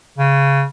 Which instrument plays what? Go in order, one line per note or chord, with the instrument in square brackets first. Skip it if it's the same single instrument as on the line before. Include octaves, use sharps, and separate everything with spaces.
[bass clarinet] C#3